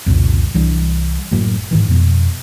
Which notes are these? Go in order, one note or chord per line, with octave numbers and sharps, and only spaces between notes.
C2 F2 A#2 C#3
C2 E3 G3 D4
F#1 A2 F#3 A#3
G#2 D#3 E3
F2 B2